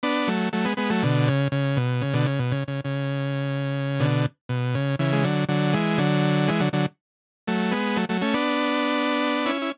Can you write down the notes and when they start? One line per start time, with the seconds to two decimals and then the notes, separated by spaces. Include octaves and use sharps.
0.03 B3 D4
0.28 F#3 A3
0.53 F#3 A3
0.65 G#3 B3
0.77 G#3 B3
0.90 F#3 A3
1.03 B2 D3
1.27 C#3
1.52 C#3
1.77 B2
2.01 C#3
2.14 B2 D3
2.26 C#3
2.39 B2
2.52 C#3
2.68 C#3
2.84 C#3
4.00 B2 D3
4.49 B2
4.75 C#3
4.99 C#3 E3
5.13 G#3
5.24 D3 F#3
5.49 D3 F#3
5.73 E3 G#3
5.98 D3 F#3
6.48 E3 G#3
6.60 D3 F#3
6.73 D3 F#3
7.47 F#3 A3
7.71 G#3 B3
7.96 F#3 A3
8.09 F#3 A3
8.21 A3 C#4
8.34 B3 D4
9.46 C#4 E4
9.62 E4